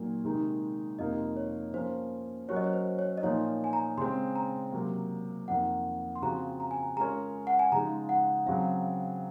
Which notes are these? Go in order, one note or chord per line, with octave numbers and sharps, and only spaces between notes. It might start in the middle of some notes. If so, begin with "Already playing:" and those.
Already playing: A#2 F#3 A#3 D#4
C3 D#3 G#3 D#4 A#4
F2 C3 F3 A#3 D#4 D#5
C#5
F3 A#3 C#4 C5
F#3 C#4 F#4 A#4 C#5
D#5
C#5
C5
C#5
D#5
A#2 F3 A#3 D#4 C#5
G#5
A#5
C#3 G#3 C4 C6
A#5
C3 F#3 A#3
F2 D#3 A#3 F#5
C6
C#3 F3 C4 F#4 A#5
A#5
G#5
A#5
G#3 C#4 F4 A#4 C#5 A#5
F#5
G#5
C#3 F3 G#3 D#4 A#5
F#5
C#3 F#3 C4 F5